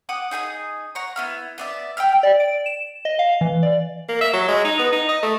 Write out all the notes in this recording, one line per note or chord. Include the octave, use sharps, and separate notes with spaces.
F#5 D6 D#6
D#4 G#4 A#5 D#6
F#5 A#5 C#6
B3 E4 F6
B3 D5 E5
G5 B5 E6 F6
D5
D7
E7
D#5
F5
E3
D5
A#3
E5
F#3
G#3
D#4
B3
D#4
D#5
A3